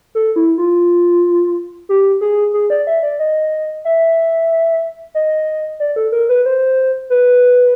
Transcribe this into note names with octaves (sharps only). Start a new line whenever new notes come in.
A4
E4
F4
G4
G#4
G#4
D5
E5
D5
D#5
E5
D#5
D5
A4
A#4
B4
C5
B4